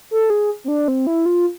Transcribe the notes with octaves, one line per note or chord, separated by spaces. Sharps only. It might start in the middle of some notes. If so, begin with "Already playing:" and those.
A4
G#4
C4
D4
C4
E4
F4